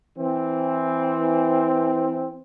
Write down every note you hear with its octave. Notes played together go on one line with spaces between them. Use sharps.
E3 C4